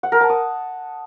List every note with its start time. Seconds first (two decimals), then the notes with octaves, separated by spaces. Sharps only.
0.03 F#5
0.12 A#4
0.21 A5
0.30 D#6